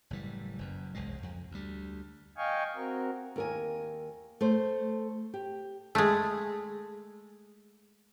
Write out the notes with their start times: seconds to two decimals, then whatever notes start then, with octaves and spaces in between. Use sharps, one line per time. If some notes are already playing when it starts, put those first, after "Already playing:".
0.10 F#1 A2 E3 G3
0.59 F#1 F#2
0.95 E1 C2 C#3 G#3
1.23 F2
1.51 D2 G3
2.37 D#5 F5 G5 G#5 C#6
2.76 C4 F#4 A#4
3.36 D#2 A#4 G#5
4.41 A3 C5
5.34 G4
5.95 G#3 A3